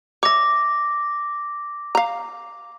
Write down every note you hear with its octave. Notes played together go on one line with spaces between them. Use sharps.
C#5 E5 D6 A#6
F5 A#5